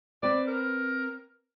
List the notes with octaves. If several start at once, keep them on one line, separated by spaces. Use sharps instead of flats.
C4 B4 D5
A#4